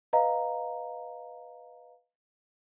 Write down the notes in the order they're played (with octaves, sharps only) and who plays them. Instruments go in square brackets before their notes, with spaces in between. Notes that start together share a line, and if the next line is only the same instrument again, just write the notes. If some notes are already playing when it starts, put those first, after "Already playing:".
[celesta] B4 D#5 F5 A#5